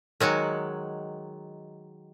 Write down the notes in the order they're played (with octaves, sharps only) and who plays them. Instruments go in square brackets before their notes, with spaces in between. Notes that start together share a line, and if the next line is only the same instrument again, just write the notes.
[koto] D#3 F#3 G#3 F#5